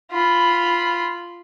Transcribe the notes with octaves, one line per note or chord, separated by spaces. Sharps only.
F4 B5